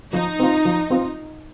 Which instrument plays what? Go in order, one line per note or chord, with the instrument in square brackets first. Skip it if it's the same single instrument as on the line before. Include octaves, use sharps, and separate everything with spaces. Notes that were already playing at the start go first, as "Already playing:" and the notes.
[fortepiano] F3 [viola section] D#4
[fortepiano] C4 F4
F3
C4 F4